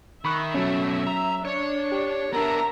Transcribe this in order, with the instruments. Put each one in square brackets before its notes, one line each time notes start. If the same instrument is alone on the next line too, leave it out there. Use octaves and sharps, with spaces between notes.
[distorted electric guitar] D#3 [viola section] E5 [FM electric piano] B5 C#6 F#6
[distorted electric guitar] B2 A3 [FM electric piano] F#3 C#4
[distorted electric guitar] A#5
[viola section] D4 [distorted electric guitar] C#5
[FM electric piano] G4
[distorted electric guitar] B3 D4 [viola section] A#4 E5 A#5